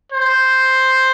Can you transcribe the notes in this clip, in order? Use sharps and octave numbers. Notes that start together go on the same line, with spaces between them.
C5